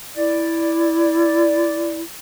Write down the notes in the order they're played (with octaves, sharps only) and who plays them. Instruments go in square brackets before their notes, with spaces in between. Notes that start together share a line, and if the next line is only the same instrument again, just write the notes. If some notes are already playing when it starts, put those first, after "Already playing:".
[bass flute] E4 [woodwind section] D5